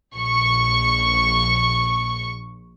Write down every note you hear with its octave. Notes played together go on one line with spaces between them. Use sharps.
A#1 C#6